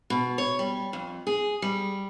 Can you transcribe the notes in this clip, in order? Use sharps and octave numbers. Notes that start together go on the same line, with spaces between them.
B2
C#5
G3
F2
G#4
G3